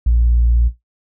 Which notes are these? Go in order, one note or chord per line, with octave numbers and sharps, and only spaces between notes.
A#1